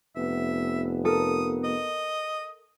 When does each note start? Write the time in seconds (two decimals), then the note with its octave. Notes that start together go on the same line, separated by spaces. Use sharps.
0.16 F1 B3 E5
1.05 A4 A#4 D#6
1.64 D#5